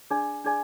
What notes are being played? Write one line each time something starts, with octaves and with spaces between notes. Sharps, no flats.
D4 G#4 D5 G#5
D4 G#4 D5 G#5